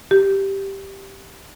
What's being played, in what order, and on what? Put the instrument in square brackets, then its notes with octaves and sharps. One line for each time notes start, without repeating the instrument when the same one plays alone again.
[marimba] G4